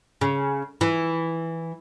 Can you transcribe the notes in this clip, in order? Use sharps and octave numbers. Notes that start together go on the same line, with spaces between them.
C#3
E3